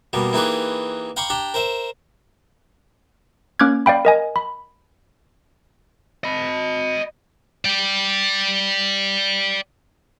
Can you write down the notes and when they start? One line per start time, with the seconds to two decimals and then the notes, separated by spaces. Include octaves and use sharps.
0.13 B2 G3 A#3
0.33 E3 A#3 D#4 G4 G#4 B4
1.17 F5 G5 A#5 B5 C#6 D6
1.30 D4 G4 G5 A#5
1.54 A#4 C5 E5
3.60 A#3 C#4 D6 F6 F#6 G#6
3.86 D5 F5 G5 B5
4.05 A#4 D#5 G#5
4.36 B5
6.24 D#5 B5
7.65 D5 G5